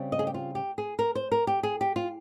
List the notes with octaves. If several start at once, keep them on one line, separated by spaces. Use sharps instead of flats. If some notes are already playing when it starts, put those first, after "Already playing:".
Already playing: C#3 G3 C4
D#5
G#4
G4
F4
G4
G#4
A#4
C5
A#4
G4
G#4
G4
F4